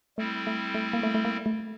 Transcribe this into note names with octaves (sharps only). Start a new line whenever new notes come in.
G3 A3 C4 E4
A3
A3
A#3
A3
A3
A#3
A3